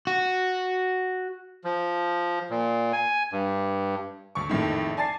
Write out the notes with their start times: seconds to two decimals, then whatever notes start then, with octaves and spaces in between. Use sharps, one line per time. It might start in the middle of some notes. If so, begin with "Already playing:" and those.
0.07 F#4
1.64 F3
2.50 A#2
2.93 G#5
3.32 G2
4.35 D2 C#6
4.49 A#1 F2 A2 D#3
4.97 D5 G#5 A5 A6 C7